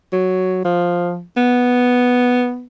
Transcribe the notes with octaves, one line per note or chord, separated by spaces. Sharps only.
F#3
F3
B3